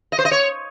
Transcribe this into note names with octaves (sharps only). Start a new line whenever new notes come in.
D#5
C5
D#5
C#5